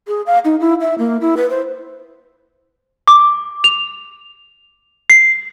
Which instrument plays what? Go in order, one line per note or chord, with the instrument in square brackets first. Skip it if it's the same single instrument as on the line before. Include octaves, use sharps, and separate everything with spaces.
[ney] G#4
F5
D#4
E4
E5
A#3
E4
B4
C5
[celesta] D6
F7
C7